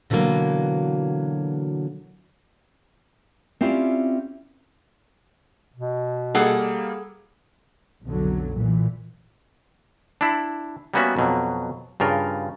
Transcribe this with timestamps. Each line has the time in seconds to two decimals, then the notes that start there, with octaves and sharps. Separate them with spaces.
0.10 B2 D3 E3 F#3 A#3
3.61 C4 C#4 E4 F4 G4 D5
5.76 B2
6.35 G3 A#3 G#4 A4 F#5
8.06 B1 F2 D3 F#3
8.55 A#2 E3
10.21 D4 E4
10.94 G3 A#3 B3 C#4 F#4 E5
11.17 F2 B2 F#3
12.00 G2 C#3 F4 A#4